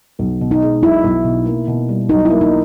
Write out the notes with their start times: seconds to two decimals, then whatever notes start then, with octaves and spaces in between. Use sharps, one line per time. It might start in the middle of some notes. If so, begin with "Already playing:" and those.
0.19 B1
0.41 B2
0.51 D#4
0.62 G#3
0.82 B1 E4
1.04 B1
1.25 B2
1.45 A#3
1.68 B2
1.89 G3
2.09 B1 D#4
2.25 A#3 E4
2.41 D#4